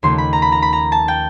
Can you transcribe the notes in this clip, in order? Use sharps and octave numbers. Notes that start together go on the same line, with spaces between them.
D#2 C#3 F3 A3 C6
B5
A#5
B5
A#5
B5
A#5
A5
G5